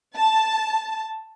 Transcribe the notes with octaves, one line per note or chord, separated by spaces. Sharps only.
A5